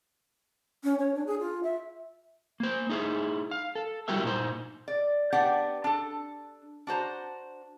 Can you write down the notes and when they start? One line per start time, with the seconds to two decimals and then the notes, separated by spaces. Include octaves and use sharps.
0.84 C#4
0.99 C#5
1.15 D4
1.27 G#4
1.40 F4
1.63 E5
2.60 A#3 C5
2.89 D#4 E4 G#4
3.51 F5
3.75 A4
4.08 G3 E4 F#4 G4 A#4 E5
4.23 A#2 D#4 C5
4.88 D5
5.32 B3 D4 G4 D5 F#5 G5
5.84 D4 A4
6.87 D4 F#4 C5 A#5